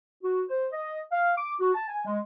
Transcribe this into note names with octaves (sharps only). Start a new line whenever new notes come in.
F#4
C5
D#5
F5
D6
F#4
A5
G#5
G#3